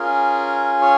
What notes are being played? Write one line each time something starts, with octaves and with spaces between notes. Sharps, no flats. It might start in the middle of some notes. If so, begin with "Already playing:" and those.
Already playing: C#4 F4 G#4 A#4
C#5